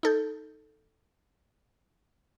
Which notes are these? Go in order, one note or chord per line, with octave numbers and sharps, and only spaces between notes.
D#4 A4 G6